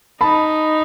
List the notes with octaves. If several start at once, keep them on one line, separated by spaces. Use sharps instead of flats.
D#4 A5 B5